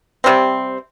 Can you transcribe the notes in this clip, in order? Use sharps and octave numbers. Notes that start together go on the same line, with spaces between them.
C3 G3 C4